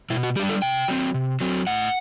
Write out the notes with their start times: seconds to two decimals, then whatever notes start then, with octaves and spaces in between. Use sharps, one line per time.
0.10 B2 E4
0.23 F#4
0.36 G3 G4
0.39 D4
0.49 A4
0.62 C3 G5
0.88 F#3 C4
1.14 C3
1.41 F#3 C4
1.67 A2 F#5